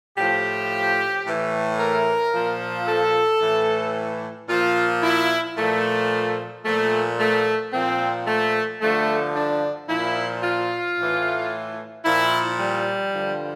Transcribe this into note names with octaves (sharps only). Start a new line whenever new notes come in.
A2 F3 G4
A2 E3
A#4
A#2 F3
A4
A2 E3
A#2 F3 F4
E4
A#2 F3 A3
A#2 F3 A3
A3
A#2 F3 C4
A3
G2 D3 F3 A3
D4
A#2 F3 E4
F4
A2 E3
A#2 F3 E4
G3
G2 D3 F3